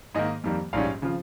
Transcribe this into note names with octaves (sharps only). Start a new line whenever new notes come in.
G#2 D#3 A#3 D#5
F2 D#3 G3 A#3
A#1 G#2 G3 C#4 F5
C#3 F3 C4 F4